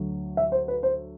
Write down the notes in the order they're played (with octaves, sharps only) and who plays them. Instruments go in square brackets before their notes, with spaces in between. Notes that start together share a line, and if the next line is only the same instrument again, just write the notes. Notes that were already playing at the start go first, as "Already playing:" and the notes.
Already playing: [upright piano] D2 F#3
E5
C5
B4
C5